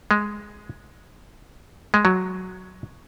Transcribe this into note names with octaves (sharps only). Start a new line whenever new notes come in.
G#3
G#3
F#3